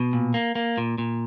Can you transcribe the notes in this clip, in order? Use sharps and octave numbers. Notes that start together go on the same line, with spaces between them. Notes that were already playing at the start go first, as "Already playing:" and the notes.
Already playing: B2
A#2
A#3
A#3
A#2
A#2